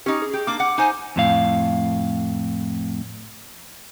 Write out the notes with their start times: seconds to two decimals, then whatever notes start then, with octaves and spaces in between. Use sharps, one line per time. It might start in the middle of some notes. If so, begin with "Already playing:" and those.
0.06 C#4 D#4 G4
0.22 G#4
0.33 G4
0.47 A#3 D4 D6
0.60 F#5
0.78 D#4 C5 G#5
1.16 F2 A2 F5